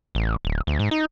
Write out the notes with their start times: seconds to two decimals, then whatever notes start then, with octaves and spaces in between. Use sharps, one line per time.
0.15 A1
0.45 D1
0.67 D2
0.79 G#2
0.91 D#4